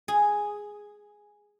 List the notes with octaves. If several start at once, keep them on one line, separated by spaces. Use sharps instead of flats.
G#4